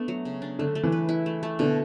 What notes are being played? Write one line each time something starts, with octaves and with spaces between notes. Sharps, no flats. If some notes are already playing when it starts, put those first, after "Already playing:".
Already playing: A3 B3 D4
F#3
C#3
D4
D3 A3
A3
E3
B4
E4
A3
A3
B2 D3